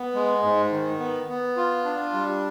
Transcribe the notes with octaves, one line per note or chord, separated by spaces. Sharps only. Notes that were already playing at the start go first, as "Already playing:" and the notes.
Already playing: B3
G#3
G#2
D#3
B3
B3
F4
D4
G3